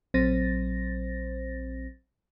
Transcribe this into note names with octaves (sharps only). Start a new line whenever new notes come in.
A#1 F#3 C4 C5 A6 A#6